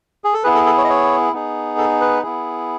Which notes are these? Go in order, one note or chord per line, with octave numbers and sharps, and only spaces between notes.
G#4
A4
B3 E4 G#4 B4
A4
A4
C#5
D#5
C#5
B3 D#4 G#4
A4
B4
B3 E4 G#4